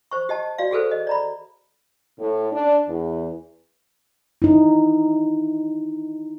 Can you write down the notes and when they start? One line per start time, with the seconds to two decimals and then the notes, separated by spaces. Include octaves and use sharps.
0.11 C5 C#6
0.29 G4 D#5 A5
0.58 F#4 D5 F5
0.71 F#4 G#4 A4 B4 C5
0.91 D#5
1.07 D5 A#5 B5
2.20 A2
2.52 D4
2.88 E2
4.42 D#4 E4